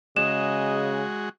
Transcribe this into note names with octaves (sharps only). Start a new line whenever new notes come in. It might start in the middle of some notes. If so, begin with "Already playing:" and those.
C#3 G#3 F#4 D#5 E7